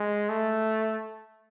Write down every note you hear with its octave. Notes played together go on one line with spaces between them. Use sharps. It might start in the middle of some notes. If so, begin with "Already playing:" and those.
Already playing: G#3
A3